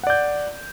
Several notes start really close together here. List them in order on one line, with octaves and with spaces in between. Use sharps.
F#5 D5 G6